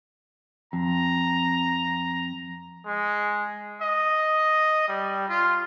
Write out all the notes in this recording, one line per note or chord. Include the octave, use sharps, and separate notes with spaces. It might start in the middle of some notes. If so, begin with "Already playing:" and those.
F2 A#5
G#3
D#5
G3
F4